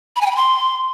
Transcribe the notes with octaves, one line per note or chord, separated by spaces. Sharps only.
B5
G#5
G5
B5
C6